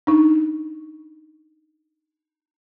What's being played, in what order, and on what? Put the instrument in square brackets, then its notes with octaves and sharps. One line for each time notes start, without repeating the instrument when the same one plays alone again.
[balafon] D4 D#4